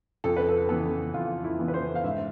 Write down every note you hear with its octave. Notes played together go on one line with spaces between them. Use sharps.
F2 A4
B4
A4
E3 B3 A4
F2 F4
E4
E3 B3
B4
C5
F5
G#2 E5